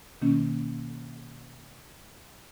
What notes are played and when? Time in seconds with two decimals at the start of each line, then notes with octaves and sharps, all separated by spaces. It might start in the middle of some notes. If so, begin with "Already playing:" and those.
0.21 B2 D#3 A#3 C#4